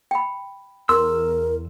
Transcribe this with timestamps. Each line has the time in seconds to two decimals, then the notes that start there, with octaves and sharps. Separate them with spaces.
0.11 G5 B5
0.89 E2 A#4 C6 E6